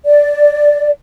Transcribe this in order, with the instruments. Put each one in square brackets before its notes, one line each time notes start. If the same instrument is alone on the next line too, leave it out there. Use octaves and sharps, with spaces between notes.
[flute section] D5